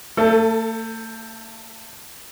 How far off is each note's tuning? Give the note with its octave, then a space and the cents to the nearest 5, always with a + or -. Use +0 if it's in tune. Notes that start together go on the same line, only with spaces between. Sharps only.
A3 +40 A4 +5